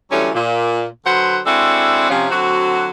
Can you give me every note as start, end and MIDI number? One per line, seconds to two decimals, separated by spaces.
0.11 0.29 50
0.11 0.29 52
0.11 0.29 54
0.11 0.29 55
0.11 0.29 57
0.11 0.29 61
0.35 0.85 46
1.05 1.38 50
1.05 1.38 54
1.05 1.38 71
1.05 1.38 72
1.05 1.38 78
1.46 2.07 56
1.46 2.07 60
1.46 2.07 62
1.46 2.07 64
1.46 2.07 66
1.46 2.07 69
2.10 2.29 48
2.10 2.29 53
2.10 2.29 61
2.30 2.90 50
2.30 2.90 54
2.30 2.90 60
2.30 2.90 66